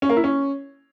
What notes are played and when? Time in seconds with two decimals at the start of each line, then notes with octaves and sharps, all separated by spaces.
0.02 C#4
0.09 A#3
0.17 E4
0.24 C#4